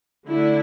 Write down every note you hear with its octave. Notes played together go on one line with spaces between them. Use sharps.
D3 A3 D4 E4